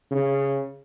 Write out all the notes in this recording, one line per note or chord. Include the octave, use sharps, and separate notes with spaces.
C#3